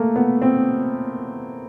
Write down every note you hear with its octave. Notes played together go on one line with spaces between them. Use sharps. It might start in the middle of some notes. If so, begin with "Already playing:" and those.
Already playing: A3 A#3
B3
C4